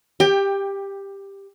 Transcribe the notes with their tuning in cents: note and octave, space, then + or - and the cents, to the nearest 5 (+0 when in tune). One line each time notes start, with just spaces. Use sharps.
G4 +10 G5 +25